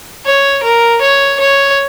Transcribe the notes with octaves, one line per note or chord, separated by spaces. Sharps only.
C#5
A#4
C#5
C#5